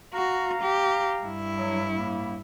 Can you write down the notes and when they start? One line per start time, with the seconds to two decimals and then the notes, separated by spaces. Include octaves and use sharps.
0.13 F#4 F5 A#5
0.62 G4
1.22 G2 E4
1.57 F#3
1.97 A2 A#3